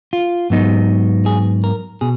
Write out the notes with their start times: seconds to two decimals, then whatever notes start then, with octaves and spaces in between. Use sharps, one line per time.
0.13 F4
0.50 G#2 F#3 B3 D#4
1.26 G#4
1.64 A#4
2.01 B2 G#4